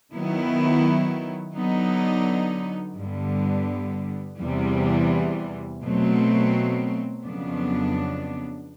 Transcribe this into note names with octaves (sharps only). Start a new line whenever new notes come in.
D#3 F#3 B3 E4
D3 F#3 B3 D#4
G2 D3 G3 B3
E2 C3 E3 G3
B2 F#3 A3 C4
F2 C#3 F#3 B3 D4